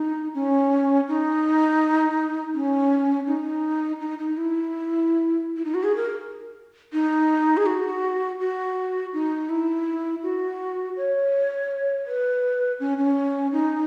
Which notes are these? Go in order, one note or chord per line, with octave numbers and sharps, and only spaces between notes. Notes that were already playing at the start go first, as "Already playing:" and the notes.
Already playing: D#4
C#4
D#4
C#4
D#4
D#4
D#4
E4
E4
D#4
F#4
G#4
A#4
D#4
G#4
F#4
F#4
D#4
E4
F#4
C#5
B4
C#4
C#4
D#4